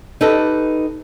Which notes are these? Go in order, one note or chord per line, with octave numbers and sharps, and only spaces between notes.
D#4 G4 A4 B4 D#5